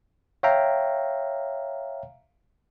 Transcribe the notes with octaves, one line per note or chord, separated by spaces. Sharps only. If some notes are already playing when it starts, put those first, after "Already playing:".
C#5 E5 F5 G5 A#5